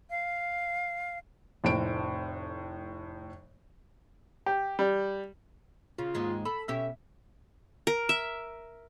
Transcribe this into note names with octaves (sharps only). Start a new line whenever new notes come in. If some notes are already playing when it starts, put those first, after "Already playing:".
F5
F1 A2 C4 D7
G4
G3
C#3 F4
D#2 G#2 G#3
A4 B5
B2 C#4 G4 E5
A#4
E5